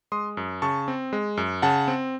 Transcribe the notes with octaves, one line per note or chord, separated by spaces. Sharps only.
G#3 C6 D#6
F#2
C#3 A5 C#6
C4
G#3
F#2
C#3 F#5 A5
C4